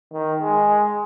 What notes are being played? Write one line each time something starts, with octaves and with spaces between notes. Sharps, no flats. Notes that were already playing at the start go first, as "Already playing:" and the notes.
D#3
G#3